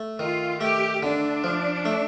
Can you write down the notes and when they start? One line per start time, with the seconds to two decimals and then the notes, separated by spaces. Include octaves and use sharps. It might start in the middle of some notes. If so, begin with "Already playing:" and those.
Already playing: A3
0.19 D#3 F4
0.61 A3 G4
1.03 D3 D4
1.44 F3
1.85 A3